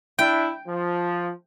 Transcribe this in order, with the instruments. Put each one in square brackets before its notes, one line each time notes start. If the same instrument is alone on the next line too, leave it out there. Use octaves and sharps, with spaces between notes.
[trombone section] D4 E4 [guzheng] G5
[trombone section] F3